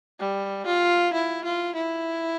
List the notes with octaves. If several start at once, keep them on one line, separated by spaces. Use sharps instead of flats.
G3
F4
E4
F4
E4